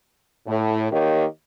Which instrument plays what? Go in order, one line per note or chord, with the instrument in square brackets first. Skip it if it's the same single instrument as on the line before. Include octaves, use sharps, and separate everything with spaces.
[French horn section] A2
D#3 A#3 G4 C#5 D#5